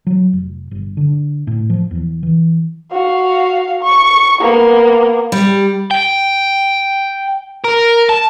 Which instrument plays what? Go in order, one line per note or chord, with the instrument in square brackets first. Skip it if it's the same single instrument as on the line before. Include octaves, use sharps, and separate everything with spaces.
[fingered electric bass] F#3
F1
G1
D3
A2
F3
E2
E3
[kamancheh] F#4 F5
C#6
A#3 B3
[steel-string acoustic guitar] G3
[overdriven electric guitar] G5
A#4
A5